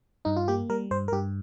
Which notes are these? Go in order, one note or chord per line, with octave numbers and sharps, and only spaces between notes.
G2 D#4
F4
A#3 G4
G3 A#4
G2 C5
A#4
G2 G4